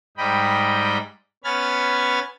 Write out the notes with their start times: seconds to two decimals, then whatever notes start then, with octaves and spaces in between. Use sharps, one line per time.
0.17 G#2 G3 D#5 G5 B5
1.44 B3 C#4 B5 F6 G#6 A6